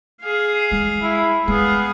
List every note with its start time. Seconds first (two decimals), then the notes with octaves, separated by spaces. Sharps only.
0.22 G#4 F5
0.71 G#3
1.03 E4
1.48 G#3 B3 G#4 F5